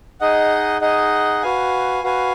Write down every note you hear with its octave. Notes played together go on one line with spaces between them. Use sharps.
D#4 G#4 D#5 F#5
D#4 G#4 D#5 F#5
F#4 B4 F5 G#5
F#4 B4 F5 G#5